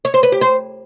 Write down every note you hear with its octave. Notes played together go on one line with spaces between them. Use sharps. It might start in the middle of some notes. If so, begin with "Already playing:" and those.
C#5
C5
B4
G4
C5